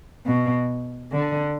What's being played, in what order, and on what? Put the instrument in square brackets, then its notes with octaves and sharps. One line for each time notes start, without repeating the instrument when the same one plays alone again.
[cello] B2
D3